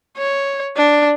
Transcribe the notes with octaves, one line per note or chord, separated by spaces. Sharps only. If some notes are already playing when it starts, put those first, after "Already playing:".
C#5
D4